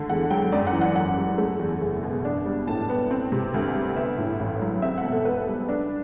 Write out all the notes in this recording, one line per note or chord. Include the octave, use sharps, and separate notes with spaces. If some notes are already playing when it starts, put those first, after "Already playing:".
Already playing: D3 A3
E2 F#5
F#3 G5
F#2 D5
F#5
E3
F#5
F#2 F#5
G3
A3
E2
F#1
B2
D4
G3
A2 A5
B3
C4
C3
D2
G3
B3 E5
A2
A1
F#3
C4 E5
F#5
B2
A4
B1 B4
G3
D4